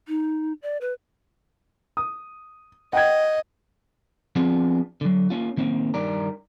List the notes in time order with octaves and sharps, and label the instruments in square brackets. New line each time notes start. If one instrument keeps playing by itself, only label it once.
[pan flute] D#4
D5
B4
[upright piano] D#6
[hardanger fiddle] D#5 [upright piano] F#5 G5 G#6
[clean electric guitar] F3 B3 C4 D4 F4 G#4
D3 F#3
A#3 C#4 F4
D#3 A#3 C4 C#4
G2 D#3 G3 A#4 D5 A#5